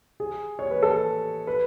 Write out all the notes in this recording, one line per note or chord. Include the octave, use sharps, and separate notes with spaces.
G#4
C#5
B4
A4
B4